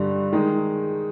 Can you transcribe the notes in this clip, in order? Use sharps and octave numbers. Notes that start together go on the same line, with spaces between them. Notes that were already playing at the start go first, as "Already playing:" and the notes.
Already playing: G2 D3 G3
D#3 G#3 D#4